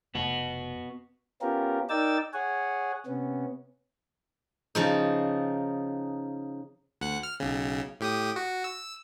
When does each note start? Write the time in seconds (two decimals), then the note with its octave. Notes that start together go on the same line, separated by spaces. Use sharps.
0.15 F1 B3 F#4
1.42 B3 C#4 F4 G4 A#4
1.90 D#4 A#4 D5 G5 E6 A6
2.33 G#4 C#5 F#5 G#5
3.06 C3 B3 C#4
4.75 C#3 F3 D#4
7.01 D2 F#5 F#6
7.23 F6
7.40 B1 C#3
8.00 A2 G4 D#6
8.36 F#4
8.64 E6